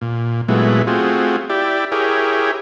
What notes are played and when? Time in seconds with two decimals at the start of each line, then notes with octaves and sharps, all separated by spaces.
0.01 A#2
0.49 A#2 F#3 G#3 A3 B3 E4
0.87 A3 C4 F4 F#4 G#4
1.50 E4 G4 D5
1.92 E4 G4 G#4 A#4 C#5